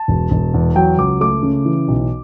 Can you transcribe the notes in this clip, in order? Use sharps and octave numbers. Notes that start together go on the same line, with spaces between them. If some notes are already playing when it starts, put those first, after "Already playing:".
Already playing: A5
E1
E1
E2
F#3 G5
C#2 D6
A3 D6
C#3
E3
B1